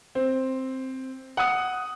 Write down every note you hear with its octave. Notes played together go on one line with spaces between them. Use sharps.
C4
F#5 D#6